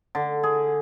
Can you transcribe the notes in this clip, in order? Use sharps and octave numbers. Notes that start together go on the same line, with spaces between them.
D3
G#4